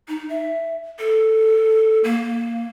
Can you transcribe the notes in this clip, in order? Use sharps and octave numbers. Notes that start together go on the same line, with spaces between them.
D#4
E5
A4
A#3